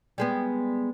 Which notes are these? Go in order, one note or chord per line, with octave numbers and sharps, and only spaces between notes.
G3 G#3 B3